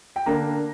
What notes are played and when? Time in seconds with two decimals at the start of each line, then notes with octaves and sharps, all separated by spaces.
0.16 G5
0.26 D3 A#3 D4 A#5